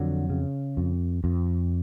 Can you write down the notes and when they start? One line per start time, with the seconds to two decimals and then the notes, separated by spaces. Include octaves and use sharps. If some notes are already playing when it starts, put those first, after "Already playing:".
Already playing: F2 D3 F#3
0.30 C#3
0.77 F2
1.24 F2